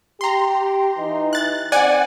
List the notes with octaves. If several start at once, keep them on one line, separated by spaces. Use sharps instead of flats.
G4 A#5 C6
E3 D#4
F#6 A6
C#3 C4 D5 F#5 G#5